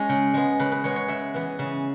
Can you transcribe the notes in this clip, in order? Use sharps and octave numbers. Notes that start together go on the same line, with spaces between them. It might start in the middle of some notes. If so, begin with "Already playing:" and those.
Already playing: G#3 C#4 E5
C#3
G#3 B3
C#3 B4
B4
G#3 B3 C#5
C#5
C#3 E5
E3 B3
C#3